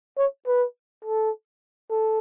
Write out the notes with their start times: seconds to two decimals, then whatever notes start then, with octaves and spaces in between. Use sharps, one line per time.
0.18 C#5
0.47 B4
1.04 A4
1.90 A4